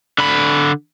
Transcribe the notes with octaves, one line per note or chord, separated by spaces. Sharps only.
D3 B5